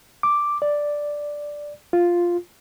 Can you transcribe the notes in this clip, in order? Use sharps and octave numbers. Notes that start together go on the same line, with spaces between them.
D6
D5
F4